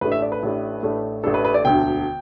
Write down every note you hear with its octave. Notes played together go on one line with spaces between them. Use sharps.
A1 A2 A3 D4 B4
E5
D5
B4
A1 A2 A3 D4
A1 A2 A3 D4
A1 A2 A3 D4 A4
B4
B4
D5
E1 D2 D3 G5